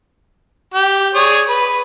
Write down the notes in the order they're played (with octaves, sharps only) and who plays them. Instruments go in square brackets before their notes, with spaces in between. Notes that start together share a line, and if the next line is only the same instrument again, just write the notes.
[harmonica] G4
G#4 C#5 D5
B4